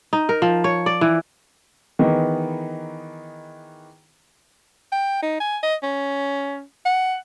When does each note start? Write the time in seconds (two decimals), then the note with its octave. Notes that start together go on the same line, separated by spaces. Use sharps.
0.13 D#4
0.29 A#4
0.42 F3
0.64 C#5
0.86 D5
1.01 E3
1.99 D#3 E3 B3 D#4 G#4
4.92 G5
5.22 D#4
5.40 G#5
5.63 D#5
5.83 C#4
6.85 F#5